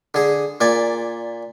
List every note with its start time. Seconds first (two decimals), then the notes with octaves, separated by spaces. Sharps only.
0.14 D3 G#4
0.61 A#2 D5 G#5